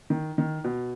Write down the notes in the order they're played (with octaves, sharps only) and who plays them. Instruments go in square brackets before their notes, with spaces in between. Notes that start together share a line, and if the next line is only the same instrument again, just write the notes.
[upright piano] D#3
D#3
B2